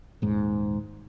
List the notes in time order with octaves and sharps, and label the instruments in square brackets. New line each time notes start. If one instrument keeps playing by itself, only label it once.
[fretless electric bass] D#1 G#2